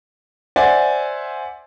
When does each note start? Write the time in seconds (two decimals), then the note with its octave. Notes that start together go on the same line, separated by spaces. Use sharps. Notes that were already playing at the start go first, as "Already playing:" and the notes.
0.56 C5 D5 E5 F#5 G#5